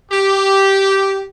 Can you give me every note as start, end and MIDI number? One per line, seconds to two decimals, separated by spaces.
0.12 1.23 67